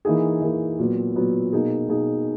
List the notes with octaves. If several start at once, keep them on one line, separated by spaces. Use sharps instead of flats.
E3 A#3 D#4 G#4
E3 A#3 D#4 G#4
A#2 F#3 B3
A#2 F#3 B3
B2 A#3 D#4 G#4
B2 A#3 D#4 G#4